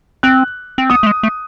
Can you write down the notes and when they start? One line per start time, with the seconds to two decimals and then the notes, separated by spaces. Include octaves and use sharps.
0.23 C4 F#6
0.78 C4
0.90 B3 D#6
1.03 A3
1.06 G#3
1.23 A3